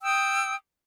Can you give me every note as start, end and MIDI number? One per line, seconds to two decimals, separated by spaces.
0.03 0.55 79
0.03 0.55 87
0.03 0.55 88